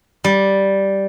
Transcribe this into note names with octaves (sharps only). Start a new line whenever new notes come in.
G3